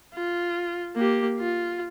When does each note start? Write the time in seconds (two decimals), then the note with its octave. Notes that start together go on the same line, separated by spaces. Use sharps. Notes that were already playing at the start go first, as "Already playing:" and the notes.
0.14 F4
0.96 A#3 G4
1.39 F4